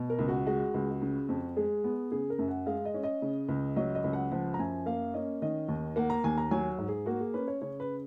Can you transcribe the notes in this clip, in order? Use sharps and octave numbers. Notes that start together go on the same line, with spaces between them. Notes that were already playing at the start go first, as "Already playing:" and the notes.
Already playing: B2
A#4
C#2
F#4
G#3 F#4
C#2
C#3
F2
G#3 G#4
B3
C#3 G#4
A#4
F#2
F#5
G#3 F5
D#5
C#4
D#5
C#3
C#2
F#3 D#5
D#5
C#2
F#5
F3 F#5
A#5
F#2 G#5
A#3 F5
C#4 D#5
D#3 D#5
D#2
A#3 F#5
A#5
D#2 G#5
A#5
F#3 G#5
G#2
G#4
A#3 F#4
G#4
C#4 B4
C#5
C#3 C#5
B4